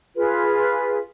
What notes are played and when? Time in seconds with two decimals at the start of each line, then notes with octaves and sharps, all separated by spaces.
0.16 F4 G#4 B4